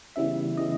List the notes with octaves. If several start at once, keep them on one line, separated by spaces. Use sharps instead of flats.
C#3 E3 G3 B3 E5
C#3 E3 G3 B3 D#5